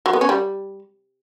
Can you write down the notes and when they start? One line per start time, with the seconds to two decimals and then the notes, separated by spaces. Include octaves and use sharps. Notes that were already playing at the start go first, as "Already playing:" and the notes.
0.06 F#3
0.13 B3
0.21 C#4
0.29 G3